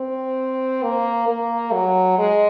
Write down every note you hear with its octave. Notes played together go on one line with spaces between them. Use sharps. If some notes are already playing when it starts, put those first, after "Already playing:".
Already playing: C4
A#3
A#3
F#3
G#3